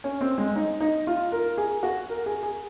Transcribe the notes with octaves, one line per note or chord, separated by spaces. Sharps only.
C#4
C4
G#3
D#4
D#4
F4
A#4
G#4
F#4
A#4
G#4
G#4